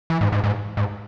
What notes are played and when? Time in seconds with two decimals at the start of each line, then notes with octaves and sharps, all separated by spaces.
0.10 E3
0.21 G#2
0.32 G#2
0.44 G#2
0.77 G#2